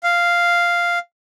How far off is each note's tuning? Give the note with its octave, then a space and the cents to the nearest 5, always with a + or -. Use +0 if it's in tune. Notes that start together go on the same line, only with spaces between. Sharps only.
F5 -5